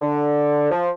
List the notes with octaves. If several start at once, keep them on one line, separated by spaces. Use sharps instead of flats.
D3
F3